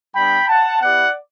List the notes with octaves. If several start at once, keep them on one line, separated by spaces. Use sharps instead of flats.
G3 B3 D4 G5 B5
F#5 A5
B3 E4 G4 D5 F#5